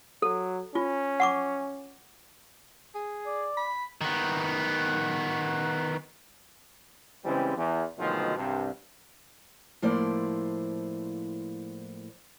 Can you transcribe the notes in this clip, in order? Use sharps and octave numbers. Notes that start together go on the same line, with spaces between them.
F#3 A4
C#4 F4
F#5 C#6 D6
G#4
D5
B5
D#3 B3
C#3 E3 G3 G#3 C4
E2
D2 B2 D#3 F3 F#3 G#3
C2 G2
A2 F3 A#3 E4 C5 D5